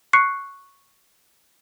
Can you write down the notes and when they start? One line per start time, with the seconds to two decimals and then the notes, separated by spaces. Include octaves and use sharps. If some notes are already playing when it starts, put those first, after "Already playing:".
0.13 C#6 F#6 C7 C#7